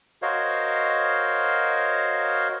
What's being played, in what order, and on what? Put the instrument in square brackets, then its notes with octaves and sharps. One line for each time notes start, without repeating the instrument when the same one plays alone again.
[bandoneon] F#4 A#4 C5 C#5 D#5 F5